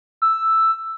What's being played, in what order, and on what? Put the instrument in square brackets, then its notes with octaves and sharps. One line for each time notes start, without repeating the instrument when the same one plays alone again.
[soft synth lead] E6